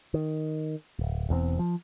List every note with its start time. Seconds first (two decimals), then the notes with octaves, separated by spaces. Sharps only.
0.14 D#3
0.99 D1
1.29 E1 E2 B2 C4
1.59 F3